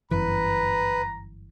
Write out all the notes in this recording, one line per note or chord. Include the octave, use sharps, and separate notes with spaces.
G1 F#2 E3 B4 A#5